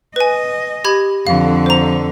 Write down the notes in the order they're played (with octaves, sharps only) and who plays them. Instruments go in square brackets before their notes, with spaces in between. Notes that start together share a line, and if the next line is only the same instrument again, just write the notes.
[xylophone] B4 G#5 [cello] D#5
[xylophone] G4 B5 G#6
[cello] F2 D3 [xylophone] F5
[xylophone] C5 A#5